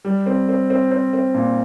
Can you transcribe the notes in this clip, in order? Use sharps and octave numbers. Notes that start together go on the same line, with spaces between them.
G3
C4
C4
C4
C4
C4
A#2